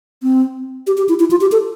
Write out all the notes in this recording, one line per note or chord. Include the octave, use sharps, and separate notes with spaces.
C4
G4
G4
E4
E4
F4
G4
A4